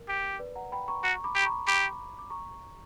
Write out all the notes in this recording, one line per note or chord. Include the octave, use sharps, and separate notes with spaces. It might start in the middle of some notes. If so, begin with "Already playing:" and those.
Already playing: A#4
G4
B4 D5
F#5 A#5
G5 B5
A#5 C#6
F#4 A#5 C#6
B5 D6
G4
B5
A#5 C#6
G4 B5 D6
D6
A#5 C#6